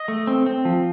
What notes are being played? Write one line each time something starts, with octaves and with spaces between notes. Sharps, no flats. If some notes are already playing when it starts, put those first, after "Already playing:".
Already playing: D#5
A3
C4
C4
F3